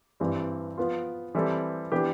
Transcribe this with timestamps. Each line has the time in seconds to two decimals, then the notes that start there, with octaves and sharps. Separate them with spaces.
0.20 G2 E3 G3 C4
0.77 F3 B3 F4
1.35 E3 G3 C4 E4 A4
1.92 E3 B3 D4 G4